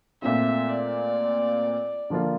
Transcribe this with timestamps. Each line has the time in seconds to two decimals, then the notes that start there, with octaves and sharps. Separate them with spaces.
0.22 A#2 A3 C4 F4 E5
0.69 D5
2.10 D3 F3 A#3 F4